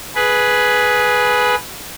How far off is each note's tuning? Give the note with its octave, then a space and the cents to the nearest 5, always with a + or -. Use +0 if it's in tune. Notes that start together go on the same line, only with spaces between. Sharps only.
G#4 +10 B4 -5